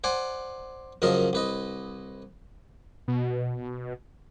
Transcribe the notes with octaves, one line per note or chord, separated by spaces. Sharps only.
C5 D5 F#5 G#5
F#2 C#3 F3 A#4 D#5 A5
C2 B4 D#5
B2